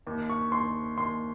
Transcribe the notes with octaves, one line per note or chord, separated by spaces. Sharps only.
D#2
C#6
D#2 C6
D#2 C6